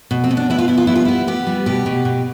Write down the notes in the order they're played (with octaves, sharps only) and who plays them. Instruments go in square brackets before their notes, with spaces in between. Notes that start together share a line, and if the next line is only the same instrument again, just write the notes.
[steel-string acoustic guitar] B2
C4
B2
D4
B3 E4
F4
B3 E4
F4
G3 E4
F4
B3 E4
B3 G4
G3
B2 G4
B2
B2